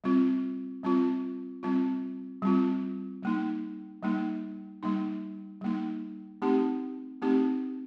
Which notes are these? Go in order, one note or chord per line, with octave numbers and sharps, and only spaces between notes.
G3 C4 F4
G3 C4 F4
G3 C4 F4
G3 C4 F4
G3 A#3 D#4
G3 A#3 D#4
G3 A#3 D#4
G3 A#3 D#4
A3 C4 D#4 G4
A3 C4 D#4 G4